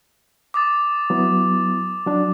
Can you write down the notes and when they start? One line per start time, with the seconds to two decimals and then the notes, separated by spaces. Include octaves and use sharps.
0.54 D6 D#6 A6
1.10 F#3 B3 E4
2.07 F#3 D4